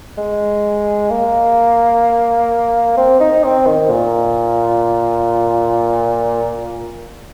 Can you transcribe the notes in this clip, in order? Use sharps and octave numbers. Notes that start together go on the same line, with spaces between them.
G#3
A#3
C4
D#4
C4
D#3
A#2